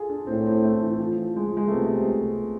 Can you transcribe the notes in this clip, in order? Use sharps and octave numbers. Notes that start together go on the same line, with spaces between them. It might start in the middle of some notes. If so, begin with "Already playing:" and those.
Already playing: F4 G#4 A4
D4
A2 C4
C4
A3
E3
F3
G#3
F3
G#3
A3
C3 B3